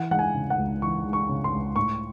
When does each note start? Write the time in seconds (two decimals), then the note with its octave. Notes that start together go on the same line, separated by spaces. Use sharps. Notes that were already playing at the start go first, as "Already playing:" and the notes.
Already playing: E3 F#5
0.11 G#3 F#5
0.19 G#5
0.34 C#3
0.50 F#5
0.58 C#2
0.82 E3 C#6
1.06 G#3
1.13 C#6
1.28 C#3
1.44 C6
1.53 C#2
1.76 A2 C#6